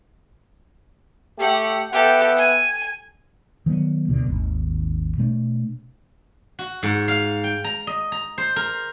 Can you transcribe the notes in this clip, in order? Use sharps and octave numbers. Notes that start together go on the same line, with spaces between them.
A3 G4 F#5
B3 G4 A4 E5 F#5
G#5
D#3 F#3 A#3 B3
D2 B2 D3
G#1 D#2
B2 A3 D4
F#4
G#2
F5
G5
A#5
D#5
A#5
C5
A#4